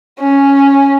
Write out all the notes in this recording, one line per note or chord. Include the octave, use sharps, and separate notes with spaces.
C#4